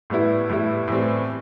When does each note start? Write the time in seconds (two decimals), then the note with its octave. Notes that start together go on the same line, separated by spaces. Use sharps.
0.10 A2 G3 B3 E4
0.49 A2 G3 B3 E4
0.88 A2 E3 G3 C4